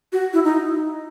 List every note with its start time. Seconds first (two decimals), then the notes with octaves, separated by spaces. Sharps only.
0.12 F#4
0.33 E4
0.44 D#4